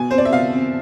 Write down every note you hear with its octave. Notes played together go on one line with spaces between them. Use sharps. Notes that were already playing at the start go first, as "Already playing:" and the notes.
Already playing: B2 G#5
C4 C5
D5
E5
B2 F5
C4